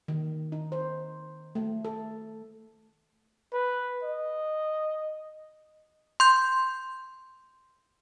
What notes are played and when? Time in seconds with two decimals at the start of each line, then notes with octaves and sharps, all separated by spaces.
0.08 D#3
0.52 D#4
0.72 C5
1.55 A3
1.85 A4
3.53 B4
4.03 D#5
6.20 C6 G6